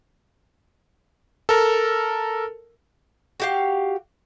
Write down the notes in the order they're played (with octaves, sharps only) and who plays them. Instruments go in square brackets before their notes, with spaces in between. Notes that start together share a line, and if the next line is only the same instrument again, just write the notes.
[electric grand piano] A4 A#4
[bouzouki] F#4 G4 F5